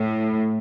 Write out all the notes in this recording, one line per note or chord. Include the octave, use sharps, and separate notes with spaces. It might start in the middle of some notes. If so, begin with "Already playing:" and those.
Already playing: A2